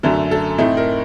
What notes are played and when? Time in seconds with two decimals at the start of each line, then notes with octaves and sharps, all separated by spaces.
0.03 F#2 D3 F#3 A3 A4
0.31 A4
0.58 A2 A3 C4 D#4
0.77 A#4